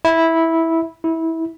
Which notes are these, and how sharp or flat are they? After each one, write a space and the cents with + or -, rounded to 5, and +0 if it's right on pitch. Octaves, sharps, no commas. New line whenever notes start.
E4 -10
E4 -20